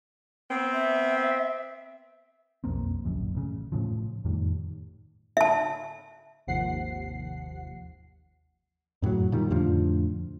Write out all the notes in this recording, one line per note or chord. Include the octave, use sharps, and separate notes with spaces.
B3 C4
E5
B1 F2 A#3 C4
D1 A#1 F#2
A1 C#3
A2 C#3 F3
F2 A2 D#3 G3
E5 A5
G#1 D#2 C3 F3 F#5 C7
F#2 A2 C#3 F#3
A#2 D#3 G3
F2 A2 D3 F3